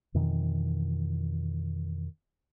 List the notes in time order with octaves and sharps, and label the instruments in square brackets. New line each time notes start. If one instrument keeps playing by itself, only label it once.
[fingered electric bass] F2 B2 D#3 E3